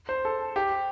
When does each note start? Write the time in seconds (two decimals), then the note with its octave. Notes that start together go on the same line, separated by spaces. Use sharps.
0.09 C5
0.25 A4
0.56 G4